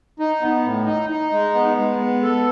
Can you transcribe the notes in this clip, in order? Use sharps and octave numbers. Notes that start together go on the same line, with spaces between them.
D#4
B3
A2
D#4
D#4
G#3
B3
G#3
B3
A4